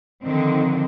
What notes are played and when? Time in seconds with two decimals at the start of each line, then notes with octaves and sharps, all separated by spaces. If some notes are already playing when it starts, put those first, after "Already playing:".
0.23 D3 D#3 F3 C4